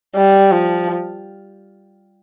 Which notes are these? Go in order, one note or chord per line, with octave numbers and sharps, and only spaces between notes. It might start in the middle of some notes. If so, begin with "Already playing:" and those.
G3
F3